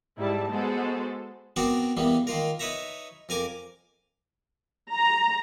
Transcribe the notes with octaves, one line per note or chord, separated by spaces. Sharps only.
G#2 G3 E4 A5
G#3 B3 F#4 G#4 A4 C5
B3 C4 D4 F#4 A#4 D5
E2 E3 G3 A#3 B3
D#3 A#3 F4 A#4
D#4 B4 C#5 E5 A#5
F2 A#4 G#5 D6
A#5